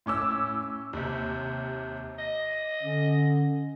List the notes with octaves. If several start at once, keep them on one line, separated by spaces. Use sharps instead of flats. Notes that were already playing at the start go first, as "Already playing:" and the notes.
A2 C#4 D6 E6
D#2 C3
D#5
D3 C#4